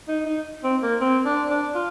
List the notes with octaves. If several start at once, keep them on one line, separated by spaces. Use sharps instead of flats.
D#4
D#4
C4
A#3
C4
D4
D4
F4